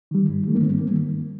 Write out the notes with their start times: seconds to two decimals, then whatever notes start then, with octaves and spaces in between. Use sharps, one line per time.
0.11 D#3 G3
0.28 G2
0.46 D#3 G3 A3
0.55 A#3
0.63 G2 C4
0.81 D#3 G3 A#3